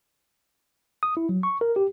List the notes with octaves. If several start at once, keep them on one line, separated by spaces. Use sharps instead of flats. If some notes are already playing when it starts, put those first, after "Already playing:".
D#6
E4
F#3
C#6
A#4
G4